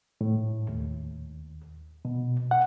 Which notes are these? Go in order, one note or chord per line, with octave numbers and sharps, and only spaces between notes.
A2
D#2
B2
F#5